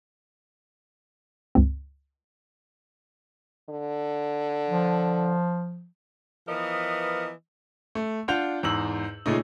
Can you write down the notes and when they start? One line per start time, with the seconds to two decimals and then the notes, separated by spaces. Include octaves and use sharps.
1.55 C#2 G2 C4
3.69 D3
4.68 F3
6.48 E3 F3 B3 A#4 D#5
7.95 A3
8.28 D4 F4 F#5 G6 F7
8.63 E2 G#2 E6 F#7
9.26 A#2 C#3 A3 D#4